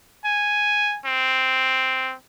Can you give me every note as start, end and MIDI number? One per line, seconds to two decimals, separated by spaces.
0.25 0.98 80
1.05 2.14 60